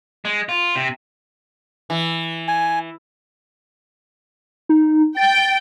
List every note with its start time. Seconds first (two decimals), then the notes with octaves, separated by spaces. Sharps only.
0.25 G#3
0.49 F4
0.76 C3
1.90 E3
2.48 G#5
4.69 D#4
5.17 G5 A6